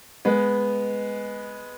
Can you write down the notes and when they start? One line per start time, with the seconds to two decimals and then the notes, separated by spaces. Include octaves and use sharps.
0.25 G#3 B3